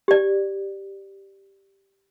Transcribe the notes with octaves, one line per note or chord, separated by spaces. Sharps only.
G4 D5